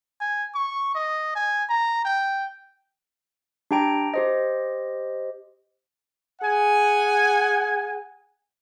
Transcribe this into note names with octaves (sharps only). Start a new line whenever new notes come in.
G#5
C#6
D#5
G#5
A#5
G5
D4 G4 G5 A#5 D7
G4 C5 D#5
G#4 F#5 G#5